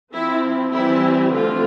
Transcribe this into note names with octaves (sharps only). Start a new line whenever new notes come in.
F3 C4 E4
E3 G3 C4 E4
D3 F3 A3 C4 F4